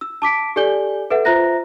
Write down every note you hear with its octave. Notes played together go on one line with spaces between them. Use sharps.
E6
A5 D6 B6 D7
G4 A4 D5 G#5 G6 G7
A4 B4 E5 F#5
F4 C5 E5 A#5 F#6 A#6